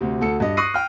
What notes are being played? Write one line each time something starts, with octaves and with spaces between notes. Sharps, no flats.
D2 C3
D2 A4 C#7
G2 D#5
C#6 D#6 F#6 A#6 C7 D#7
G5 F6